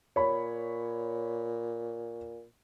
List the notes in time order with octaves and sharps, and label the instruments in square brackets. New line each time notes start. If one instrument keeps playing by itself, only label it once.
[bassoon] A#2 [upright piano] C#5 B5